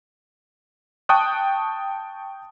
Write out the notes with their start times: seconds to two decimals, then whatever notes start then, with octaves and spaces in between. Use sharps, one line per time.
1.09 G5 A5 C#6 D#6 F#6